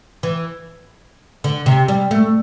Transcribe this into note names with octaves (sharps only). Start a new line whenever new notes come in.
E3
D3
C3
G3
A3